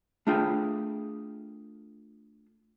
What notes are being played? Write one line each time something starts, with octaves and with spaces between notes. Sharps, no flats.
A3 D4 F4 G#4 G5